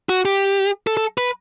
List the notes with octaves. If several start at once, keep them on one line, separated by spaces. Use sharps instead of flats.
F#4
G4
A4
A4
B4